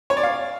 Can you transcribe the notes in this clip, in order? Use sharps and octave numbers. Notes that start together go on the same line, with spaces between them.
C#5
D5
F5